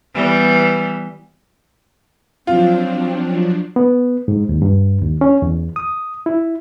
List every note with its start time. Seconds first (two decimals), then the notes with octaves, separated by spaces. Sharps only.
0.14 E3 G3 B3
2.47 F3 F#3 C4 D4 F4
3.76 B3
4.28 G#2
4.49 D#2
4.62 G2
5.01 D#2
5.21 C#4
5.42 E2
5.76 D#6
6.26 E4